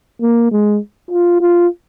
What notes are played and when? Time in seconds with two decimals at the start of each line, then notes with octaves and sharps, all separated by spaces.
0.21 A#3
0.52 G#3
1.10 F4
1.40 F4